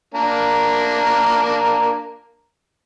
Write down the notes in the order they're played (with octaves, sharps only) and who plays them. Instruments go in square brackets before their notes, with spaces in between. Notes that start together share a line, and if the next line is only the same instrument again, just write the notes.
[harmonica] A#3 D4 A#4